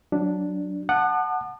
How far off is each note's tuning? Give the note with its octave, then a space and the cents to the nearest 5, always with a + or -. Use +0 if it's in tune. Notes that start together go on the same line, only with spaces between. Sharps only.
F#3 +0 D4 +0
F#5 +0 A5 +0 D#6 -45